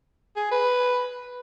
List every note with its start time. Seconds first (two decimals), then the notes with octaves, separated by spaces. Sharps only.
0.37 G#4
0.51 B4